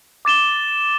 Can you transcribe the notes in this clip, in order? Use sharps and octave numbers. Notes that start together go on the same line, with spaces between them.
D6 A6 E7 G7